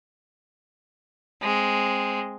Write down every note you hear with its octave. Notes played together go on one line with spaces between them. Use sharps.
G#3 C4